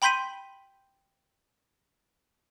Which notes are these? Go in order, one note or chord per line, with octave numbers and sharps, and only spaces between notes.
G5 B5 C6 G6 B6 D#7